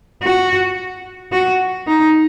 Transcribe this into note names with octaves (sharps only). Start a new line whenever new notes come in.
F#4
F#4
D#4